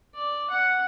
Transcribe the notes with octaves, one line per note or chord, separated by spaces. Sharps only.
D5
F#5